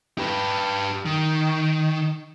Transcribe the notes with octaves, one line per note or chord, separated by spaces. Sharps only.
G4 B4
D#3